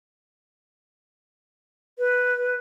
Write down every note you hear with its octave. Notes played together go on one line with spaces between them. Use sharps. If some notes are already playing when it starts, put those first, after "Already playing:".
B4